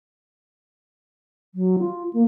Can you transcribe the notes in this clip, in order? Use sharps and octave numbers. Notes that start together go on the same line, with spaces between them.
F#3
F4
A#3